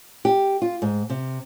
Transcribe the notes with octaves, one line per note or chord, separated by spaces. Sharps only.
G4
F4
G#2
C3